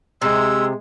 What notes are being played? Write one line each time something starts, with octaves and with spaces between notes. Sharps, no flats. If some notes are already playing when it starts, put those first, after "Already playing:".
C3 G#3 E6